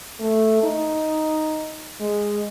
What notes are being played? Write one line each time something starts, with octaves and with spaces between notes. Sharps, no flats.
A3
D#4
G#3